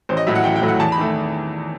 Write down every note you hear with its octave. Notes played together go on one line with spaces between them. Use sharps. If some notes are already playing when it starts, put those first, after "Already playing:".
A1 C5
D#5
A2 F#3 A3 E5
F#5
A1 G5
G5
A2 F#3 A3
F#5
E2 A5
B5
D#3 A3